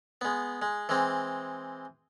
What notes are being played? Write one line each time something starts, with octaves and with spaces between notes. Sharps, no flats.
G#3 B3
G#3
E3 G#3 C4